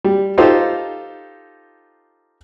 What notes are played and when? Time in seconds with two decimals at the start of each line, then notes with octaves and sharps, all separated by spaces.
0.04 G3
0.38 D#4 F4 G4 A4 C5